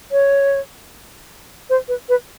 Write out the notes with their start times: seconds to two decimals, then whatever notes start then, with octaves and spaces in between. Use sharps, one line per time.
0.11 C#5
1.69 C5
1.88 B4
2.09 B4